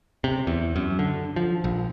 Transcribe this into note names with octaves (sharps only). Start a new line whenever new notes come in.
C3
E2
F#2
D3
F3
A#1